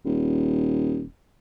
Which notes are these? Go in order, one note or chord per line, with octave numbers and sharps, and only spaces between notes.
D#1